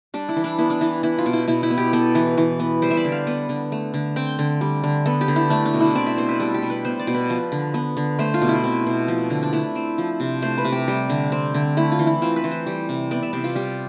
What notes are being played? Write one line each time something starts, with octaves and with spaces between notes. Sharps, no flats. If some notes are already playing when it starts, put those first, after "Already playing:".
G3 D4
E4
E3
D4
B3 E4
D4
E3 E4
B3 E4
F4
B2
E4
B2 E4
E4
B3
G4
B3 A4
E3
E3
B3
G3 C5
E5
D5
D3
F5
B3
D3
A3
D3
C4 G5
D3
G3
D3
B3 A4
G4
D3
E4
A3 D4
D4
B2
E4
C4 D5
E5
B2 C5
B4
G3 A4
G4
B2
B4
B3 C5
D5
B2
B4
F3
D3
B3
D3
A3 C5
F4
B2
E4
C4
B2
F3
D3
D4
A3 E4
C4
F3
C3
A3 C5
B4
C3
G4
G3
D3
C4
D3
A3 E4
F4
E3
E4
C4 F4
B4
E3
C5
G3
C3
B3 D5
E5
C3 D5
F4
G3 G4